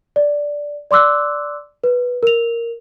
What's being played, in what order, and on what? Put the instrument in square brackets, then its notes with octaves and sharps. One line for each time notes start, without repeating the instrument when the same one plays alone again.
[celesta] D5
D5 C6 D6 E6 F#6
B4
A#4 F7